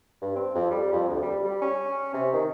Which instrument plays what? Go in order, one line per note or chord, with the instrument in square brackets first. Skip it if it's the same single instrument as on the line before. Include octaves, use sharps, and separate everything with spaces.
[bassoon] G2
C4
F2
G3
F2
D2
G3
G3
C#4
C3
D#3